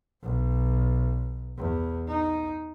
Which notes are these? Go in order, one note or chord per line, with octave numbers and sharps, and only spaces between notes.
B1
E2
D#4